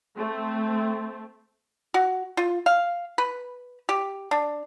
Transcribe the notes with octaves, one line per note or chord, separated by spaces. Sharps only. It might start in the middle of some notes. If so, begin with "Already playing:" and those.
A3 C4
F#4
F4
F5
B4
G4
D4